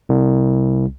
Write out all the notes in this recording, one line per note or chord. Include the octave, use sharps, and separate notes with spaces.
C2